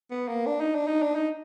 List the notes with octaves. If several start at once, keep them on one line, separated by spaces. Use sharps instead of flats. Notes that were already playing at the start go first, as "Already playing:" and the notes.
B3
A#3
D4
D#4
D4
D#4
D4
D#4